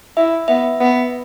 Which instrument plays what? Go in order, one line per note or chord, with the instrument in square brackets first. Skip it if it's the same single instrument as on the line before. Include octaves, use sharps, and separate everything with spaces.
[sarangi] E4 [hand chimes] E5
[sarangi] B3 [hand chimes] E5
[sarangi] B3